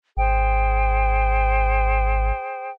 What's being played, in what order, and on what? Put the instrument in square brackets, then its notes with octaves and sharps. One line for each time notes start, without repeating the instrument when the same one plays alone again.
[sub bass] G#1 [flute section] G#4 C5 G5